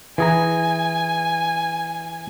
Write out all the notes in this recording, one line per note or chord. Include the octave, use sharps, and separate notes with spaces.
E3 G#4 G#5 A#5